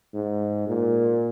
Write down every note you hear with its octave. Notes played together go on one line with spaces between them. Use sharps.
G#2
A#2